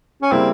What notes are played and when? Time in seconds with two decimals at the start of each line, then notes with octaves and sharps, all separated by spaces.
0.22 C#4
0.32 C#3 G3 A#3 C4 E4